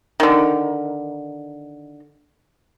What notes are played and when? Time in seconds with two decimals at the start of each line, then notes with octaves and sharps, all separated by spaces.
0.20 D3 D#3